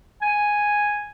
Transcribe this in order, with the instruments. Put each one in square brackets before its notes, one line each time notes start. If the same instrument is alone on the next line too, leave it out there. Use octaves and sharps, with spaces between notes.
[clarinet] G#5